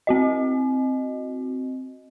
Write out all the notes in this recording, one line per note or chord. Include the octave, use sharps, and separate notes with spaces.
C4 F#4 D#5